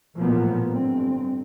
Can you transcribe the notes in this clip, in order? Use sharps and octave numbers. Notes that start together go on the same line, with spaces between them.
A1 A#2 F3 F#3 A#3 B3
G1 C4